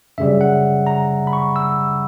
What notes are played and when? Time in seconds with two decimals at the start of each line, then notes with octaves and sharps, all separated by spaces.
0.18 F#2 C#3 G3 E5
0.41 F#5
0.87 A#5
1.27 B5
1.33 C#6
1.56 E6